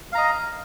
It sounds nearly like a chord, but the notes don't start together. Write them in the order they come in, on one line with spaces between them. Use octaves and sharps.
F5 A#5 D#5